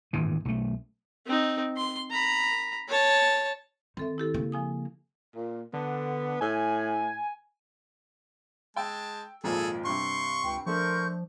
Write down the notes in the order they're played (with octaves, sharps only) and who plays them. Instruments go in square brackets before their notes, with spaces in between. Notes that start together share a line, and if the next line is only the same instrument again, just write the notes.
[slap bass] D#1 G#1 G2 E3
B1 A3
[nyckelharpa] C4 D#4
C6
A#5 B5
C#5 A5
[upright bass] D#3 [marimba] C4 A4 E5
[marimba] E4 G4 A4
[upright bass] C#3 A#3
[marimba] F3 G#5 D#6
[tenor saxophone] A#2
[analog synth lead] D3 [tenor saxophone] B3
[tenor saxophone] A2 [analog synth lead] G#5
[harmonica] G#3 A5 [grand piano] G5 E6
[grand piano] G#1 F2 A#2 [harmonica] G#4 A4
[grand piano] G2 C3 [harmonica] C6 C#6
[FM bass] C#2 [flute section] G5
[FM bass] F3 [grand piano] A3 D4 [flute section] A#4 C6 G6 [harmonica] C#6